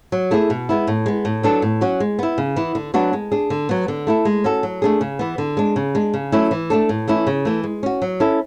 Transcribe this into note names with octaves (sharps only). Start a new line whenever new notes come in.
F#3
A3 E4 G#4
B2
G#3 B3 E4
A2
G#3 B3
A2
F#3 B3 D4 A4
A2
F#3 C#4 F#4
G#3
B3 E4
C#3
E3 B3 E4
D3
F#3 B3 D4 F#4
G#3
D4 G#4
D3
F#3 B3
D3
A3 E4 A4
G#3
C#4 F#4 A4
F#3
A3 D4 G#4
C#3
E3 B3
D3
G#3 D4
C#3
G#3 D4
C#3
F#3 A3 C#4 E4
E3
A3 D4 A4
A2
E3 A3 C#4 E4
C#3
E3 A3
G#3
C#4 F#4
F#3
C#4 E4 A4